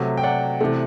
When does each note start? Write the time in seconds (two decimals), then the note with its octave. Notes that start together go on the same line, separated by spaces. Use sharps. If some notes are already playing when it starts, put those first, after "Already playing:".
Already playing: C3 F#3 A3 E5
0.17 G5
0.23 D5 F#5
0.61 C3 E3 A3